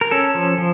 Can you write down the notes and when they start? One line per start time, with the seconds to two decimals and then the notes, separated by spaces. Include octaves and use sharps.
0.01 A#4
0.11 C#4 A4
0.35 F3
0.58 F3